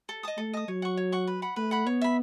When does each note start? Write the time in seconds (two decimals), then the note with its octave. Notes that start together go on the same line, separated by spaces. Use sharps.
0.09 A4
0.23 D#5 A5 D#6
0.38 A3 A4
0.53 D#5 A5 D#6
0.68 F#3 C#5
0.82 F#5 C#6
0.97 C#5
1.12 F#5 C#6
1.27 B4
1.42 F#5 B5
1.56 A3 B4
1.71 F#5 B5
1.86 B3 C#5
2.01 E5 B5